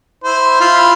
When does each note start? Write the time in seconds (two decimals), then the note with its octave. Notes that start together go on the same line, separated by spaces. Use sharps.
0.24 E4 C5
0.61 E4 F4 B5